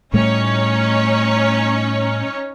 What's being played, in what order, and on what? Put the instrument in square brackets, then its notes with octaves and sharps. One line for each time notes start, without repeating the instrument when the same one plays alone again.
[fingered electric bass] A2 G3 A3 [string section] C#4 D#4 C#5